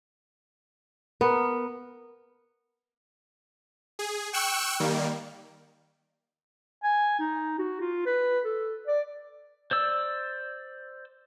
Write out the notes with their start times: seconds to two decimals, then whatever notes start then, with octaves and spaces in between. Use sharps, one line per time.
1.21 B3 A#4
3.99 G#4
4.33 G5 C#6 E6 F#6 C#7 E7
4.80 D#3 G3 A#3
6.83 G#5
7.19 D#4
7.59 F#4
7.81 F4
8.06 B4
8.45 A4
8.87 D5
9.71 C5 D5 E6